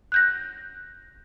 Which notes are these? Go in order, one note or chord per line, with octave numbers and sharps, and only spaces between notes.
F#6 G6 A#6